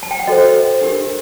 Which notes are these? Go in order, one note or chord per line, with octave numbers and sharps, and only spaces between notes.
A5
G5
F#5
F#4 A4 C5 D#5
D4 G4 A#4